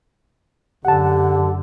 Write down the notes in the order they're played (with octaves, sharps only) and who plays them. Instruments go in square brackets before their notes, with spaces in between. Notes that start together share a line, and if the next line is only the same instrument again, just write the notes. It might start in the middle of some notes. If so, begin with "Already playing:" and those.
[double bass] F#2 [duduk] D3 [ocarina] G4 [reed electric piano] F#5 A5